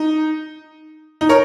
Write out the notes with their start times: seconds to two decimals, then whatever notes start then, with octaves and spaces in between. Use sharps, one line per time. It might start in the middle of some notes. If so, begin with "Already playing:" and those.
Already playing: D#4
1.21 D#4
1.29 A#4 C#5